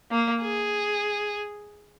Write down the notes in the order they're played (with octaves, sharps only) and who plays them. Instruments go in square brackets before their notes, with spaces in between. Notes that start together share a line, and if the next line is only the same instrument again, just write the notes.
[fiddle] A#3
G#4